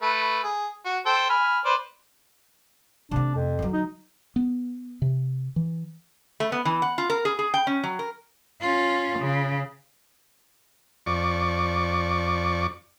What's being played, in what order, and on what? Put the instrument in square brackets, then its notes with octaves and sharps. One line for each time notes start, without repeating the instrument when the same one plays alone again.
[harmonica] A3 B4
G#4
F#4
A4 C5 G5
G#5 B5 F6
B4 C5 D5
[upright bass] C3 A3 [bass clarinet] D4
[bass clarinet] F2
[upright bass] D3 F#3
[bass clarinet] D#4
[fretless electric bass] B3
C3
E3
[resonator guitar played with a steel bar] A3
B3
E3
F#5
F4
A#4
G#4
G#4
G5
C#4
F#3
A#4
[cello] C#4 F4
C#3
[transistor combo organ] F2 D5 C#6